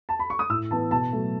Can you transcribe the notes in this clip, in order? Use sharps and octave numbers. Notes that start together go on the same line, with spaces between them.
A5
B5
C#6
D#6
A2 E6
E3 B3 A5
B2 A5
F#3 A3